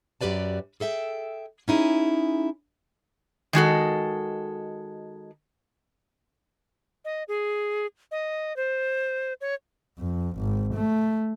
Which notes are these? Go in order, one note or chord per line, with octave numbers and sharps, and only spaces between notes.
F#2 F#4 G4 B4 D5 A5
G#4 A4 E5 G5
C#4 D#4 E4 G#4
D#3 G#3 F#4 A4
D#5
G#4
D#5
C5
C#5
F2
G#1
A3